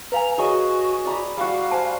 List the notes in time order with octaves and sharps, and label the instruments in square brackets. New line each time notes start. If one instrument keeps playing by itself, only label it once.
[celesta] B4 F5 G#5 [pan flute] A#5
[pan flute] F#4 [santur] G#4 C#5 D#5
[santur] D5 A#5 B5
[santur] G3 F#4 [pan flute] F5
[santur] C5 [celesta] G#5 A5